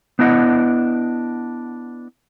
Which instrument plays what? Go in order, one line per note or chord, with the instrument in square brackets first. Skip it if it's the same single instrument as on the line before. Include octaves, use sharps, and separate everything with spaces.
[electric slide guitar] B3 D4 E4 D#5 E5 F#5